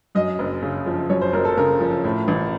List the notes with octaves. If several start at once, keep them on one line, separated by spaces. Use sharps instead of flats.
F#2 D#5
F#1
C#3
F3
F#2 C#5
C5
F#1 A#4
A4
C#3 A#4
F3
A2
A1